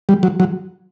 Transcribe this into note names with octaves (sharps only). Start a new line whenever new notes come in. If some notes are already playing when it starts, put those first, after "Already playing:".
G3
F#3
F#3